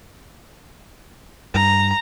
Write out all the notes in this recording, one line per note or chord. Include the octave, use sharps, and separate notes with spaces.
G2 A#5